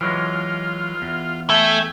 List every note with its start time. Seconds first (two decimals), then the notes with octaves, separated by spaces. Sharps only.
0.01 E3 F#3 G#3 F4
1.02 E2
1.50 A3 E5 G5 G#5